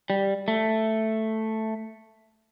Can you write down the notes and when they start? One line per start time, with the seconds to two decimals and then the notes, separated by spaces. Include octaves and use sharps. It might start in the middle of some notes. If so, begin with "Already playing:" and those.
0.10 G3
0.48 A3